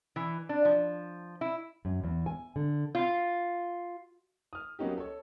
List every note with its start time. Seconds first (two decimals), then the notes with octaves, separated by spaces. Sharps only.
0.16 E3
0.49 D4
0.65 F3
1.41 E4
1.85 F#2
2.04 E2
2.26 G#5
2.56 D3
2.95 F4
4.53 D#6 F6
4.79 F#3 A#3 B3 C#4 D#4 G4
4.98 A4 C#5